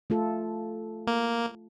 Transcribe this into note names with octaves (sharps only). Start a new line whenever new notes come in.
A3 F4 A4
A#3